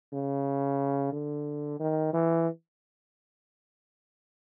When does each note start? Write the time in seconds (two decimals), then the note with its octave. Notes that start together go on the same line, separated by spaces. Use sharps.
0.13 C#3
1.12 D3
1.80 D#3
2.13 E3